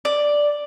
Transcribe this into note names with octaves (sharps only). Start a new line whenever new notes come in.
D5